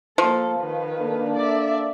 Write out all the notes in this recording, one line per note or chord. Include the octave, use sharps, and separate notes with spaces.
F3 A#3 A4
D#3 B4
A#3 D4 A4
D5 E5